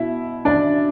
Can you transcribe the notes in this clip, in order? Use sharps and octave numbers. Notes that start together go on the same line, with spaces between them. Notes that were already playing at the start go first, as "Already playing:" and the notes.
Already playing: B2 E4 E5
D4 D5